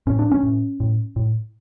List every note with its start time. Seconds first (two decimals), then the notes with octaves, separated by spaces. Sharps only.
0.07 A2 C#4
0.19 D4
0.31 C#4
0.43 A2
0.80 A2
1.16 A2